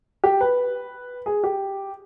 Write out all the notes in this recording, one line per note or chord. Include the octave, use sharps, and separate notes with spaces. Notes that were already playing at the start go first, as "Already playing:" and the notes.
G4
B4
G#4
G4